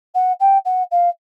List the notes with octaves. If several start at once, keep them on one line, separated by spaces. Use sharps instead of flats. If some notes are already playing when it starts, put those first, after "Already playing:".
F#5
G5
F#5
F5